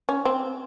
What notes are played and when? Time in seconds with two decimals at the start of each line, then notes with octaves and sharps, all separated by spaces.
0.09 C#4
0.25 C4